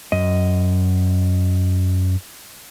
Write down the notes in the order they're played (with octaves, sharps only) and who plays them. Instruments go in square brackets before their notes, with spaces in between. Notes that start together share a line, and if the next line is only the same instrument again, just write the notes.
[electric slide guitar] F#2 D#5